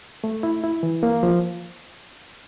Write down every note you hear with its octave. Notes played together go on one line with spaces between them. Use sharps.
A3
E4
E4
E3
A#3
F3